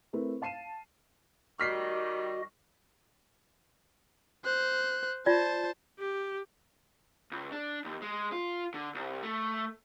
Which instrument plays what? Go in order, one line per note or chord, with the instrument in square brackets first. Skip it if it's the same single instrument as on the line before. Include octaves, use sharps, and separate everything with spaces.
[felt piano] A3 C4 E4 A#4 B4
F5 A5 C7 D#7 E7
[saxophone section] D#3 G3 [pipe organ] F#4 D#5 [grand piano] F6 B6 C7
[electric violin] C5 F#6
[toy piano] F4 D5 [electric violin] C5 A5
[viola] G4
[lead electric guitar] C#2
D4
D#2
G#3
F4
D3
C2
A3